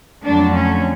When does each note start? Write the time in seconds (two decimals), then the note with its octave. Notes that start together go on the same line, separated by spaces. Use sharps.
0.24 F2 D3 F#3 A3 D4
0.54 C#4